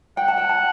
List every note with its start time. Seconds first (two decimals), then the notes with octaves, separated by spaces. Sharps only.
0.17 F#5 G5
0.28 A5
0.38 G5
0.49 A5